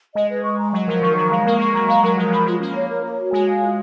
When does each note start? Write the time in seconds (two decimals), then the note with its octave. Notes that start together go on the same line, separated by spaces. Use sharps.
0.15 G#3 D#5
0.29 B4
0.44 C#6
0.59 A#5
0.72 F#3 D#5
0.88 F3 A#4
1.02 D#3 C#6
1.16 F#3 A#5
1.30 G#3 F5
1.46 A#3 A#4
1.59 G#3 C#6
1.73 F#3 A#5
1.88 G#3 F5
2.03 F#3 A#4
2.17 F3 A#4
2.31 F#3 B5
2.46 G#3 F4
2.61 A#3 C#4
2.74 C#5
2.90 A#4
3.03 C#5
3.19 F#4
3.32 G#3 G#5
3.47 F5
3.62 F4